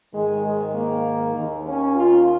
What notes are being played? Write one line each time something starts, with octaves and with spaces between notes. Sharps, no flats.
G#2 D#3 G#3
G#3
A#3
D#2 D#3
C#4
F4